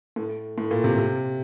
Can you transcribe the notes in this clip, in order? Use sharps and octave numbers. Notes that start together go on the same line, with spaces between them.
A2
A2
A#2
C3
C3